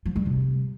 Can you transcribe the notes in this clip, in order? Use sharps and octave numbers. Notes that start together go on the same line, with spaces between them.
F3
G3
C3